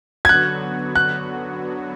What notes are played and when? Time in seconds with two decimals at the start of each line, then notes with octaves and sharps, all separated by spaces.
0.25 G#6
0.29 D3 F#3 B3 F#4 F#6
0.95 F#6